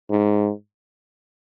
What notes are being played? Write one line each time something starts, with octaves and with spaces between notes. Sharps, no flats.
G#2